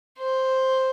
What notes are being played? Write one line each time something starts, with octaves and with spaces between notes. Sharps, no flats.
C5